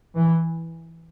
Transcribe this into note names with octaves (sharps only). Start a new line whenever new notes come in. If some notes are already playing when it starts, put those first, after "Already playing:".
E3